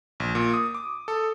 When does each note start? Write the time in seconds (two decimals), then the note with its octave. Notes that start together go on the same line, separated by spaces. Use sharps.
0.20 A#1
0.35 A#2
0.53 D#6
0.75 D6
1.08 A4